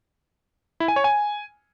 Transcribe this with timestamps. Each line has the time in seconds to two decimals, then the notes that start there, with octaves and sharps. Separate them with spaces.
0.80 E4
0.88 G#5
0.96 C#5
1.04 G#5